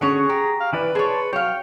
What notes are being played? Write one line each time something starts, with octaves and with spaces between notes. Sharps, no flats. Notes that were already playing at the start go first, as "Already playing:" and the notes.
D3 C#4 F#4 G#4 C#5
G4 A#5
F5
E3 E4 B4 D5
G#4 C#5 D5 A5 C6
F#3 C#5 F5 G5